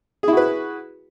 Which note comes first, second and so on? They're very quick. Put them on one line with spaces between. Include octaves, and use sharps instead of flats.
G#4 E4 F#4 B4